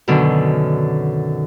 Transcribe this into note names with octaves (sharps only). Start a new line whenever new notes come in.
F#2 B2 D3 D#3